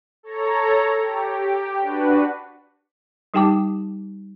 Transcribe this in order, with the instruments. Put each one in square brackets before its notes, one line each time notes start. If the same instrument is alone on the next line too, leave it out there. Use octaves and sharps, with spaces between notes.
[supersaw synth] A4 C#5 A#5
G4
D4 F#4 B4
[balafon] G3 D#4 G4 G5 A5 D6